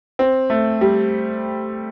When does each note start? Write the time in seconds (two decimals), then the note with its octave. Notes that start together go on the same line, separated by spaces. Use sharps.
0.19 C4
0.50 A3
0.81 G3